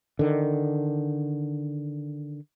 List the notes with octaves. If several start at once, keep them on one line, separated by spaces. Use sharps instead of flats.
D3 D#3